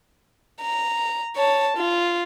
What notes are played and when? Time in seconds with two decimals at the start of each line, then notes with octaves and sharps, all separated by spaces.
0.61 A#5
1.36 C#5 A5
1.77 F4